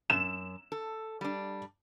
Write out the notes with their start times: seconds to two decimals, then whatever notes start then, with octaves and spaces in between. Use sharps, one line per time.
0.10 F#2 E7
0.72 A4
1.21 G3 D4